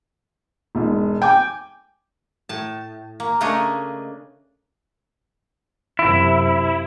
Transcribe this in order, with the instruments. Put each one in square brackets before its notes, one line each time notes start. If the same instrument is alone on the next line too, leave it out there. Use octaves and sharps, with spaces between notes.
[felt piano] E1 G#2
[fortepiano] G5 [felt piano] G#5 D6
[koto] A2 A5
A#3
C#3 A3 A#3 D4 C#5 D#5
[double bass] F#2 C3 [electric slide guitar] E4